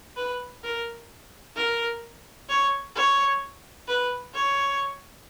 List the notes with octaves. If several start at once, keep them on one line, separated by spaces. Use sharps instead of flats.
B4
A#4
A#4
C#5
C#5
B4
C#5